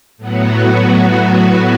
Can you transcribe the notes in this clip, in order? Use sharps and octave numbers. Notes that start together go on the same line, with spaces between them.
A2 F#3 B3 F#4